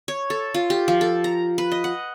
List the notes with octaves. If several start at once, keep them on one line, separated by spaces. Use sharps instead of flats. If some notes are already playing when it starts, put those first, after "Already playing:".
C#5
A4
F4
G4
F3
A4
A#5
B4
D#5
F#5